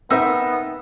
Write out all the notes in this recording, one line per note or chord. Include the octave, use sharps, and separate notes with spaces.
B3 C4 D#4 A#4 E5 E6